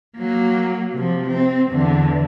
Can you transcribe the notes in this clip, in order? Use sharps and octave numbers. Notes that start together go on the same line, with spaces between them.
F#3 A#3
C3 F3
C4
E2 D3